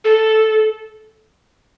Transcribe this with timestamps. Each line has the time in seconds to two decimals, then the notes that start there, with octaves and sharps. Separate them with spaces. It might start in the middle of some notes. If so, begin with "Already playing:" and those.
0.05 A4